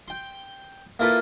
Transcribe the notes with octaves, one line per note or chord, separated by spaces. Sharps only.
G5 C6
A#3 E4 F4 A4 B4